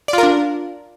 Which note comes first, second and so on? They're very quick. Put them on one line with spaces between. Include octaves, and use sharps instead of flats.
D5 F4 A#4 D4